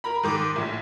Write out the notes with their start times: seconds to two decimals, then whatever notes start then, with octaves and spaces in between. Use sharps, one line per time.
0.04 A#4 A#5 B5
0.23 G#2 D#3 D6
0.56 A#1 A2